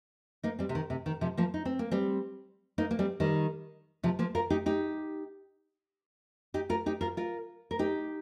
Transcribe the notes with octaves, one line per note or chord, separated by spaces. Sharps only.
A#3 D#4
G3 C4
C3
D#3
C3
D#3
C3 F3
F3 A#3
D#4
C4
A#3
G3 C4
A#3 D#4
A#3
G3 C4
D#3 G3
C3 F3
F3 A#3
F4 A#4
D#4 G4
D#4 G4
D#4 G4
F4 A#4
D#4 G4
F4 A#4
F4 A#4
A#4
D#4 G4